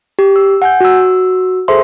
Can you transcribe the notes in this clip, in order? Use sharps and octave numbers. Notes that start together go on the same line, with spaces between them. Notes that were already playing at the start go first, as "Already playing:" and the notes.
G4
E6
F#5 G#5 G6
F#4 E6
G#4 A4 C5 E5 C6